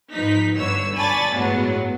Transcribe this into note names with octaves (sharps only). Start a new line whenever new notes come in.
G#2 F3 D#4 B4 B6
G1 D3 B4 C#5 E6
D5 G#5 A5 B5 C#6 A6
G1 E2 A2 F#3 G#3 B3